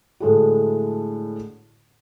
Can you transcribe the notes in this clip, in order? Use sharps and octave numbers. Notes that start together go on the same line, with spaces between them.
A2 D3 G#3 A3 E4 F#4